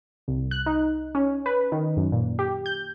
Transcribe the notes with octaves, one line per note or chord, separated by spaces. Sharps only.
C2
F#6
D#4
C#4
B4
D#3
F#2
A#2
G4
G6